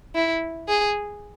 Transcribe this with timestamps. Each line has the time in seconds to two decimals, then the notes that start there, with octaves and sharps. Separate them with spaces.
0.15 E4
0.68 G#4